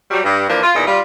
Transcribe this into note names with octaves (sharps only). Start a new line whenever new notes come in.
F#3 G3
G2
E3 F3 A#3 D4
F4
E2 A#2 D#4 E4
G3 F4